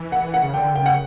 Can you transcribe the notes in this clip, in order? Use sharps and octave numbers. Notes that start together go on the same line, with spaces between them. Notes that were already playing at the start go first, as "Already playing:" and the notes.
Already playing: E3
F#5
F#5
C#3
D3 G5
C#3 G5
F#5